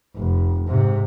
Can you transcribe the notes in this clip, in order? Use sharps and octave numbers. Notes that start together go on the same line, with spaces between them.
F1
G#2 C3